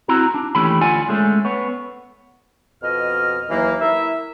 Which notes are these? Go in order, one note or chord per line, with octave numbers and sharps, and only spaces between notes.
C4 E4 F#4 A#5
D4
D#2 E3 A3 C#4 G4 B5
D3 F4 D5 F#5 G#5
G#3 A3 C#4
B3 C#5
F2 B2 D#5 F6
D#2 E3 F#3 A#3
E4 A#4 E5